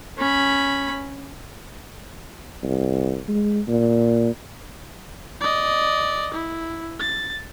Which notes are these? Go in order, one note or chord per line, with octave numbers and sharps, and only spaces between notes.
C#4 B5
C2
G#3
A#2
D5 D#5
E4
A6